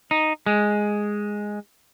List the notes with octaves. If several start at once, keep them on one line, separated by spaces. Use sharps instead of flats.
D#4
G#3